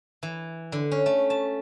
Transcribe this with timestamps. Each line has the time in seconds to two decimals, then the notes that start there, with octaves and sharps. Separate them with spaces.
0.23 E3
0.72 D3
0.91 C#4
1.06 A3
1.30 A5